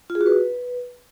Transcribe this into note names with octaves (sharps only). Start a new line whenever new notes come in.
F4
G#4
F#4
B4